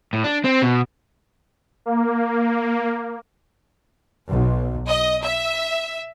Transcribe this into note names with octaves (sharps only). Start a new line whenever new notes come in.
A2
D4
C4
B2
A#3
B1
D#5
E5